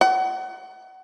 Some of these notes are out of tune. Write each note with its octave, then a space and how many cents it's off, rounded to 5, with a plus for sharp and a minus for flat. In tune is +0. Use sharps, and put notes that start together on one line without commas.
F#5 +30